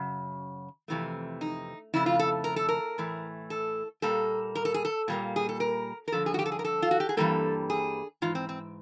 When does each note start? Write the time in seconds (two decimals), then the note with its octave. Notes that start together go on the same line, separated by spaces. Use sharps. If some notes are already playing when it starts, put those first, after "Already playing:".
Already playing: F#2 C#3
0.88 F2 C3 E3 A3
1.41 D#4
1.94 F2 C#3 A3 E4
2.06 F4
2.19 A4
2.44 A#4
2.56 A4
2.68 A#4
2.98 A2 E3 A3
3.50 A4
4.02 A#2 G3 A#3 A4
4.55 A#4
4.65 A4
4.74 G#4
4.85 A4
5.08 A#2 G3 A#3
5.36 G#4
5.49 A4
5.60 A#4
6.08 A#4
6.12 G2 D3 F3 A4
6.26 G#4
6.34 F#4
6.39 G4
6.46 A4
6.52 G#4
6.59 A#4
6.65 A4
6.82 F4
6.91 F#4
7.00 G4
7.09 G#4
7.17 G2 E3 G3 A#3 A4
7.70 G#4
8.22 G#2 E3 F4
8.35 C4
8.49 C4